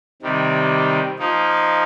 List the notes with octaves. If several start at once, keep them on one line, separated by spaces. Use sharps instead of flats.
C3 D#3 G3
F3 A#3 D#4